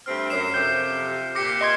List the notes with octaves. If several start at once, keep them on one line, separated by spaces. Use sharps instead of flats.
G2 A3 C4 F6
F#2 C7 E7
F2 C3 G6
A#2 G4 D6 A#6 C#7
D#5 C6 G#6